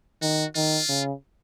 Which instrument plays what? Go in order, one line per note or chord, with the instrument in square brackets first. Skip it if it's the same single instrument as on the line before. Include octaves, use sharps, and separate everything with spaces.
[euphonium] D#3 [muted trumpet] F#4
[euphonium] D#3 [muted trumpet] F4
[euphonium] C#3